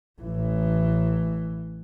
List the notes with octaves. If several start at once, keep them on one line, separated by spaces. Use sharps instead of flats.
A1 E3